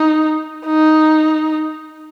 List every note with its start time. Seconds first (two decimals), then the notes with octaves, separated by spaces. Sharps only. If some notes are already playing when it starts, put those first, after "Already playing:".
Already playing: D#4
0.66 D#4